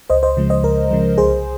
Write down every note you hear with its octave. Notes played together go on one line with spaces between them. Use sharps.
C#2 C5 D#5
C5 D#5
C#3 F3 G#3
C5 D#5
C#2 A#4
C#3 F3 G#3
C2 G#4 C5